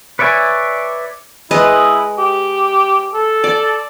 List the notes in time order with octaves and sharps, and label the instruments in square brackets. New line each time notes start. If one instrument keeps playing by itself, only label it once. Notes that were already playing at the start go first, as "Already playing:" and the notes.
[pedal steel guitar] B4 C#5 D5 E5 G#5
[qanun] G#3 B4 D#5 [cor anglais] E4
[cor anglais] G4
A4
[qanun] D5